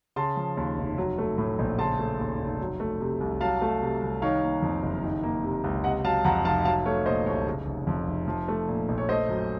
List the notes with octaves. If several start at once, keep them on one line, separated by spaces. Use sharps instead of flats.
C#3 A5 C6
F3
D#2
F1
F#3
A3
A2
A#1
C#3 A5 C6
A3
D#2
F1
F#3
A3
C3
C2
F#3 F5 A5
A3
C3
C2
D#3 C#5 F5
A#3
F2
F#1
D#3
A#3
C3
C#2
C3 D#5 F#5
F#3 F5 A5
F2 F#5 A#5
F1 F5 A5
F#3 F5 A5
A3 C#5 F5
A#2 C5 D#5
C2 C#5
C#3
F1
F2
F1
F3
A3
A#2
A#1
C#5
A3 C5 D#5
F#2